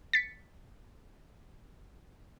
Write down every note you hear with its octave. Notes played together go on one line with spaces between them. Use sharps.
A6 B6 C#7